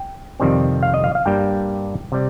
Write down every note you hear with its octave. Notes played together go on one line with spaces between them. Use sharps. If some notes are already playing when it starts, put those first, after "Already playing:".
Already playing: G5
F2 C3 D#3 G3 C4
F5
D#5
F5
F5
G2 G3 A#3 G5
C3 G3